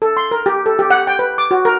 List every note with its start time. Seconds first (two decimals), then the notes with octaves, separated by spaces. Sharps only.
0.02 A4
0.17 C6
0.31 A#4
0.46 G4
0.66 A4
0.79 G4
0.91 F#5
1.07 G5
1.19 B4
1.38 D6
1.51 F#4
1.65 A#4